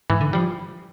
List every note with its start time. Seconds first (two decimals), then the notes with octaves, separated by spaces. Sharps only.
0.10 G#2 E3
0.21 D3
0.33 F3 G3